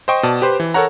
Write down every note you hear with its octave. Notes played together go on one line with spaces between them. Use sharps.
C5 D#5 G5 C#6
B2 D5 A5
G4 B4 C5
E3
A4 A#4 C#5 F#5 A#5